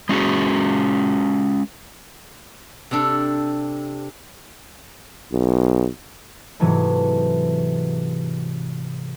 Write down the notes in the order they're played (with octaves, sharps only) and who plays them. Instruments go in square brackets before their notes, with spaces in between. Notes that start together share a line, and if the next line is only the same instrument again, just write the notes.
[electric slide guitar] G#3 C#4 F#4 G#4
[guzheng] C3 C4 D4 A4
[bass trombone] B1
[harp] G#2 C3 E3 F#3 G#3 A3